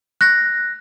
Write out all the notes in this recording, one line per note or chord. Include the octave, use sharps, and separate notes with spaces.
F#6 A#6